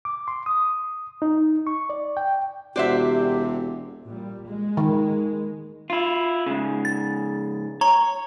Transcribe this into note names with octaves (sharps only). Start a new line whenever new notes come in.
D6
C6
D#6
D#4
C#6
D5
G5
E1 C3 F#4 G4 C5 D5 E5 F#5
A#2 G3
G#3
D#3
E4 F4
G#2 C#3
A6
C#5 A#5